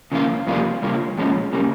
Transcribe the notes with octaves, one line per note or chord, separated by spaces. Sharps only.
C#3 F3 A#3 F4
F2 C3 G3 A#3 F4
C#3 G3 A#3 F4
A#2 F3 G#3 C#4
C#3 G3 A#3